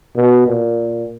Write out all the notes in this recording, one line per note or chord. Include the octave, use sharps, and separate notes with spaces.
B2
A#2